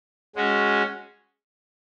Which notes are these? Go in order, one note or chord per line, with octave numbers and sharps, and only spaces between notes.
G#3 C#4 F#4